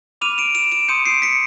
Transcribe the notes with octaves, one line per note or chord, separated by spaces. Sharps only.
B5 D6 F6 D#7 F7
D7 E7
D7 E7
D7 E7
C6 D#6 G6 C#7 D#7
C7 D7
B6 C#7